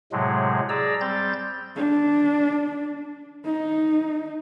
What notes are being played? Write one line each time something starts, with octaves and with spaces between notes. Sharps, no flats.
A2 C3 F#3 G#3
G#4 D5 A#5 E6
G3 C4 G6 A6
D4
D#4